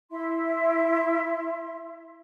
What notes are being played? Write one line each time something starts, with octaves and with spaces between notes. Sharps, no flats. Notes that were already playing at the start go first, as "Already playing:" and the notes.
E4 E5 C6